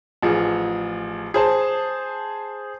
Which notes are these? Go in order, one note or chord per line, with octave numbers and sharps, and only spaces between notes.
A1 F3 G#4
G#4 C5 A5